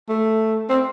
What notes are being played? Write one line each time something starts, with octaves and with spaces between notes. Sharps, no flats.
A3
C4